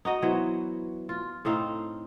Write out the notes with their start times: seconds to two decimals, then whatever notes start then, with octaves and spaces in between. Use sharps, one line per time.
0.05 D#4 F#4 D#5
0.22 E3 F#3 B3 C5
1.09 F4
1.45 A2 C4 D#4 F5